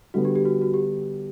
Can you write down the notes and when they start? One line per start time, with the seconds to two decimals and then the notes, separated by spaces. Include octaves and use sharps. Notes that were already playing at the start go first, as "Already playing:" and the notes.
0.14 D3 G3 B3 F#4
0.25 G4
0.35 G4
0.45 F#4
0.62 F#4
0.74 G4